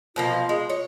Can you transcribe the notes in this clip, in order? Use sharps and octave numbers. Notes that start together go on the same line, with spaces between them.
B2 F3 A#3 F4
G#3
F4 C#5